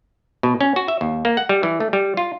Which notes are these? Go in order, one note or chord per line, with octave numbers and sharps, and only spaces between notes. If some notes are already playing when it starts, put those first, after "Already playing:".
B2
C#4
F#4
E5
D#2
A#3
F#5
G3
E3
A3
G3
F4